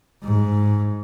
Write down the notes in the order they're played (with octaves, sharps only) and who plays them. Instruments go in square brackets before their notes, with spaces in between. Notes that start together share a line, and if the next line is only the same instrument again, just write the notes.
[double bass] G#2